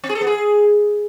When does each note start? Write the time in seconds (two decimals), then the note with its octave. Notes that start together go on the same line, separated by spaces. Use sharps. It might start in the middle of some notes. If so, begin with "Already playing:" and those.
0.04 C4
0.09 G#4
0.15 A4
0.21 B3
0.27 G#4